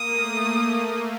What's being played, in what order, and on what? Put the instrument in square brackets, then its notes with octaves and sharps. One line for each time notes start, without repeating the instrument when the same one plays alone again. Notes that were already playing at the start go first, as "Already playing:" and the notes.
Already playing: [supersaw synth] A#3 [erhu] D#6
[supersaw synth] A3
A#3